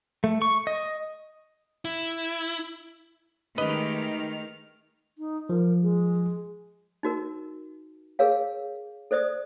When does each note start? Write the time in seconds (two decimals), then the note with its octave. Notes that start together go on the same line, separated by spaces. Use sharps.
0.24 A3
0.42 C#6
0.67 D#5
1.85 E4
3.58 D#3 G#3 A3 G4 B4 D#5 F6
5.18 D#4
5.49 F3 A#4
5.82 G#3
7.03 D#4 F#4 A#4
8.19 G#4 A#4 C#5 F5
9.11 A4 C5 D5 D#6